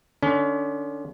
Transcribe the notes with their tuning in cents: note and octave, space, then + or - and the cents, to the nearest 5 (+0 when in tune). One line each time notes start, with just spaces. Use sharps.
D3 +25 C#4 +35